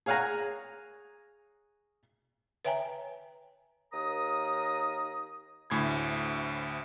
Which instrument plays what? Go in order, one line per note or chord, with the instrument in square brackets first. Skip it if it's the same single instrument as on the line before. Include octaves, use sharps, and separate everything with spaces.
[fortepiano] G#4 C#5 F5 F#5 G#5 A#5
[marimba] B4 C#5 E5 G5 G#5 A#5
[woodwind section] D#2 A#4 A#5 D#6
[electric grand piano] D2 A2 B5 G#6